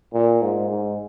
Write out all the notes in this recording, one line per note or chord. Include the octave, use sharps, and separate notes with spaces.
A#2
G#2
G#2